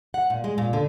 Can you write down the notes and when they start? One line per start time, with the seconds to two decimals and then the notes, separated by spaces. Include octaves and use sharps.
0.14 F#5
0.30 A#2
0.44 G#3
0.58 A#2
0.73 D3